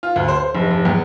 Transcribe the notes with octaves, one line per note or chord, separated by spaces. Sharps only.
F4
D2
C5
C5
F1
F1
E2